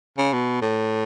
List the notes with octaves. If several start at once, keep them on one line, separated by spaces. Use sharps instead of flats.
C#3
B2
A2